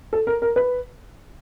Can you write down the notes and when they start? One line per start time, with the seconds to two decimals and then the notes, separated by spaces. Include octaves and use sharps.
0.13 A4
0.27 A#4
0.42 A#4
0.56 B4